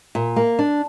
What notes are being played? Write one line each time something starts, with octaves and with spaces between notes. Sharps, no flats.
A#2
A#3
D4